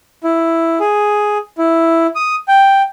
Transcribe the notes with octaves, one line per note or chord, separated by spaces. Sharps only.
E4
G#4
E4
D#6
G5